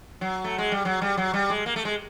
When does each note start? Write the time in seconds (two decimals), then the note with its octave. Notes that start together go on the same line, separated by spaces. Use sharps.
0.21 F#3
0.44 A3
0.58 G#3
0.72 G3
0.85 F#3
1.02 G3
1.17 F#3
1.34 G3
1.50 G#3
1.66 A#3
1.76 A3
1.85 G#3